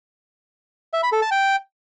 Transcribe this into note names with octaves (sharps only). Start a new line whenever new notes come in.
E5
B5
A4
A5
G5